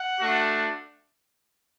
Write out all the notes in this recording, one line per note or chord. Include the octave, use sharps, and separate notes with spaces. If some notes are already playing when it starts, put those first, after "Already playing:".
Already playing: F#5
A3 D4 F#4